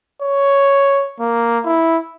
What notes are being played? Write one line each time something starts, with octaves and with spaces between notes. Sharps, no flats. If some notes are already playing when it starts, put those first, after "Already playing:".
C#5
A#3
E4